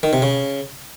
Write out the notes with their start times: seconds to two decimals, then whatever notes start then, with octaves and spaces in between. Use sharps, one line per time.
0.03 D#3
0.13 C3
0.22 C#3